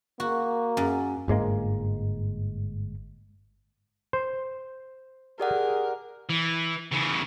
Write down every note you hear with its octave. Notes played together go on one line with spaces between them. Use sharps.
A#3 F#4
F#2
G1 G#2 G#3 A#3
C5
G4 G#4 A#4 D5 F#5
E3
C#3 E3